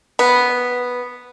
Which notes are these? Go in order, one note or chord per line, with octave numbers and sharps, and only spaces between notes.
B3